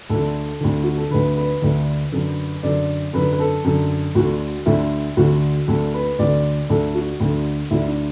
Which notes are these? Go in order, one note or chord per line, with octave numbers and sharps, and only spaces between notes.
D2 D3 A4
D2 D3
F#4
A4
D2 D3 B4
B4
D2 D3
F#2 D3
F#2 D3 D5
F#2 D3 B4
B4
A4
F#2 D3
D2 D3 F#4
D2 D3 E4
D2 D3 F#4
D2 D3 A4
B4
D2 D3 D5
D2 D3 A4
F#4
D2 D3
D2 D3 E4
D4